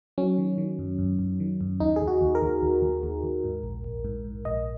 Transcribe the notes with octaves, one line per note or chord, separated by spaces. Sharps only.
F#3 C#4
D#3
D#3
F#2
F#2
F#2
D#3
F#2
D#2 D#4
D#2 G#4
F#4
D#2
A#4
D#2
D#2
D#2
D#2
D#2
G#2
A#1
A#1
G#2
G#2
A#1 D#5